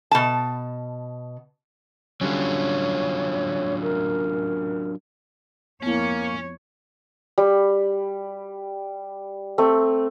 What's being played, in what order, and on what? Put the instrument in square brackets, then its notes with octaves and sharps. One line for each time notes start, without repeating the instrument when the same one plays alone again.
[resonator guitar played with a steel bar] B2 A5
[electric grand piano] D3 G3 C#4 [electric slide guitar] F#3 D4 F4 [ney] C#5
[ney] A#4
[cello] F2 C#5 [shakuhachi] A#3 [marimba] B3 E4 [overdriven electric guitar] C#4
[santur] G3
A3 C4